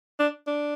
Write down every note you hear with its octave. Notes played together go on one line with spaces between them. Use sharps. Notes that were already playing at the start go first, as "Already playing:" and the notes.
D4
D4